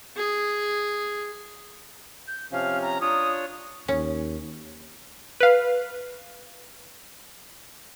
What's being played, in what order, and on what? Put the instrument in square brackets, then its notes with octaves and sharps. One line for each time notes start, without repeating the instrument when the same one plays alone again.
[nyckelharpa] G#4
[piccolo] G6
[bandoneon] C3 F3 C#4 [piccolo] F5
[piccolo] A#5
[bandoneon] D4 F4 C#5 [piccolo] D#6
[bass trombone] D#2 [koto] C#4
[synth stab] B4 F5